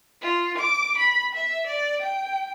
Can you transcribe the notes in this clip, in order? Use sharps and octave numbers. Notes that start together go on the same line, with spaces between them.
F4
D6
B5
E5
D5
G5